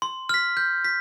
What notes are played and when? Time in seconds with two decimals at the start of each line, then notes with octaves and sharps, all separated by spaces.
0.02 C6
0.29 F6 B6
0.57 G6
0.84 B6